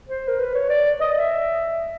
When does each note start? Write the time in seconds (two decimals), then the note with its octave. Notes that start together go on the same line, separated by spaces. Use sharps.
0.09 C5
0.28 A#4
0.39 B4
0.55 C#5
0.69 D5
1.00 D#5
1.16 E5